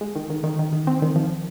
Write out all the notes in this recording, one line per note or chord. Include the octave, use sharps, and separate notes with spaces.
G#3
D#3
D#3
D#3
D#3
D#3
C4
D#3
F3